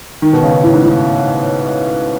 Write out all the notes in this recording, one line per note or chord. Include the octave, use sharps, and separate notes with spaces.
D#3
B2
C#3
A2
G#2
A2